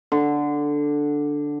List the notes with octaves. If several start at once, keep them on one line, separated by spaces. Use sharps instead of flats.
D3